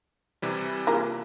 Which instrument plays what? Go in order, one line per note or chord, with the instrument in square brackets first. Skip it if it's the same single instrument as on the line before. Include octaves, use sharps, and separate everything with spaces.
[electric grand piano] C3 E3 G3
[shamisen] A#3 F4 G#4